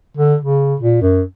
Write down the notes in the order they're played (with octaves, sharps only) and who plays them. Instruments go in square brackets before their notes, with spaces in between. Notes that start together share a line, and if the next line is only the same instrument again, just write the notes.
[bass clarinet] D3
C#3
A#2
F#2